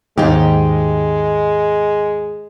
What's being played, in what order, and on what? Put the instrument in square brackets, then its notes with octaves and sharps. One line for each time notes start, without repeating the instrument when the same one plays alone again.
[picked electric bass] D#2 G#2 [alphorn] G#3 [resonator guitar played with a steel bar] D#4 G4